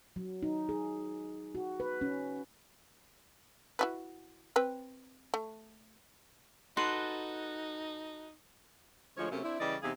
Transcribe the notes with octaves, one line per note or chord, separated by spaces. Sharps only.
F#3
D#4
G#4
F#4
B4
C#4
E4 F#4 B4
C4 B4 G5
A3
D#4 F#4 A4 B4 C6
D2 F3 G#3 C#5
C3 F#3 A3 A#3 C#4
C4 D4 E4
C#3 E3 G3 D5 D#5
E2 C3 D#4 G#4 F5